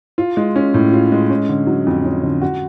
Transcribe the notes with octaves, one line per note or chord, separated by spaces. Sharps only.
F4
G#3
C#4
A2
F4
G#3
C#4
D3
F#3
F2
C#4
D3
F#4